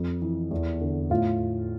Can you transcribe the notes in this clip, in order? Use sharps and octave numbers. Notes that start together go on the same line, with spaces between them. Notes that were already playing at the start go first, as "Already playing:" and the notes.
Already playing: F2
E3
E2
D3
A2 F4